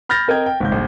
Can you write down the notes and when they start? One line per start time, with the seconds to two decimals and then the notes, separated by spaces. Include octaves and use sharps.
0.09 B5 F6 G6 A6 A#6
0.28 C4 A#4 D#5 G5 G#6
0.46 G5
0.60 G#1 C#2 G6
0.72 D#1 A#1